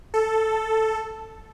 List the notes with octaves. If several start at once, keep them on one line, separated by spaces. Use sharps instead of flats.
A4